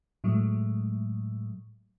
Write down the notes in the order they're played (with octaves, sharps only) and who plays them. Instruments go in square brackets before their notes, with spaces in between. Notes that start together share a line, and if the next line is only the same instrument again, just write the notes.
[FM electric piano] A2 F#3 G#3 A3